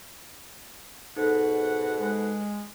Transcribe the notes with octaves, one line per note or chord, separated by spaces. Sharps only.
G#2 B2 D#4 A4 F#5
G#3